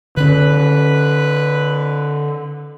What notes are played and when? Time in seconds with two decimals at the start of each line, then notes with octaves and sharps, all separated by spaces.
0.17 D3 C#4 B4